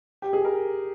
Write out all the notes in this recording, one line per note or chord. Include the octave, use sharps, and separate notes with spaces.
G4
G#4
A#4